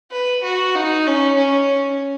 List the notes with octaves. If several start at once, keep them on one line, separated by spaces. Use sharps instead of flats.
B4
F#4
D#4
C#4
C#4